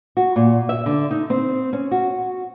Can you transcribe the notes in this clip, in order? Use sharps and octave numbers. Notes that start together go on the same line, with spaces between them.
F#4
A#2
E5
D3
D#4
C4
C#4
F#4